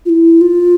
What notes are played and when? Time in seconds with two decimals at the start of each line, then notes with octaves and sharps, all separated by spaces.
0.06 F4
0.09 E4
0.41 F4